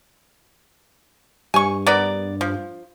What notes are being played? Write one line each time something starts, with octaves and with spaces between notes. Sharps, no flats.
G2 G#5 C#6
B3 A#4 D5
F3